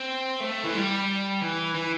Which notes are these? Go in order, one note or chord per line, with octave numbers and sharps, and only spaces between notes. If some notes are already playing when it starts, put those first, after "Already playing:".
Already playing: C4
A3
E3
G3
E3
E3